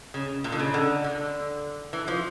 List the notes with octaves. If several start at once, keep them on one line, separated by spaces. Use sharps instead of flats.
C#3
A#2
D3
C#3
D3
D3
E3
F3